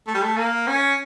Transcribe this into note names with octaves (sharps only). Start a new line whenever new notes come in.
A3
G3
A3
A#3
C#4